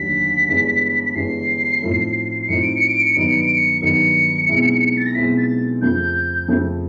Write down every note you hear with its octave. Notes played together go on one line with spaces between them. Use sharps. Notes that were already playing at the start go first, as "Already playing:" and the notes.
Already playing: F1 D#2 D3 F#3 B6
G1 G2 E3 G#3 C#4
B6
G1 G2 E3 G#3 C#4 C7
A2 F3 A3 C4 D#4
A2 F3 A3 C4 D#4 C#7
D7
C#7
D7
C#7
G2 D#3 F#3 B3 D#4 D7
C#7
D7
C#7
G2 D#3 F#3 B3 D#4 C#7
B1 B2 G#3 C4 E4
A6
A#6
B1 B2 G#3 C4 E4 B6
A6
F2 C#3 F3 A3 G6
F2 C#3 F3 A3